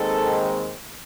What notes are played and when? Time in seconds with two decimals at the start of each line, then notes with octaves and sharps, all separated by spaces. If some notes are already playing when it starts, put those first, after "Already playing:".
Already playing: D#2 D#3 G#3 C4 A4